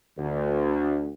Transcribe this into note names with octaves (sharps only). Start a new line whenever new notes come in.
D2